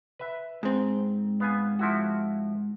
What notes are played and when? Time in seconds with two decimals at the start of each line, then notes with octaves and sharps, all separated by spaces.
0.19 B4 E5
0.63 G#2 C4
1.40 B3 F5 G#5
1.79 F3 E4 F#4